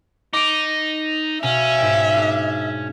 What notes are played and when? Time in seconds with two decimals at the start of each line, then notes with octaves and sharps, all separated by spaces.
0.33 D#4 D6 D7
1.43 B2 C#4 E5 F5 D#7
1.78 G#2 D#5 G5
2.15 D4 G#4